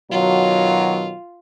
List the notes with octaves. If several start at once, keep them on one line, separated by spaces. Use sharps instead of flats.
B2 D#3 F#3 F4